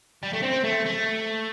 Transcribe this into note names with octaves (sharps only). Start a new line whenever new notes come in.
G3
A3
C4
A3
A3